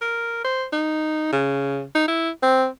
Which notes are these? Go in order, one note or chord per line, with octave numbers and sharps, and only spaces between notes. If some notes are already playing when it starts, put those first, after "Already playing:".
A#4
C5
D#4
C#3
D#4
E4
C4